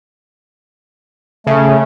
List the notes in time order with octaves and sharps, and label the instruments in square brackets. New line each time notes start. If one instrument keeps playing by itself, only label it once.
[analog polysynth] C#3 [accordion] A3